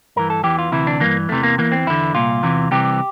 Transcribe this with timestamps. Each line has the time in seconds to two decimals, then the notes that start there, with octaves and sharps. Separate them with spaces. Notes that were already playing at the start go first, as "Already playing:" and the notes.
0.16 G2 E3 A#4
0.30 A4
0.44 E2 E3 G4
0.59 F4
0.72 D2 C3 E3 E4
0.87 D4
1.00 G2 E3 A#3
1.29 E2 C3 E3 A3
1.43 A#3
1.58 E2 E3 A#3
1.72 C4
1.87 E2 D3 E4
2.15 C2 A#2 F4
2.43 E2 C3 E3
2.71 C2 C3 E3 G4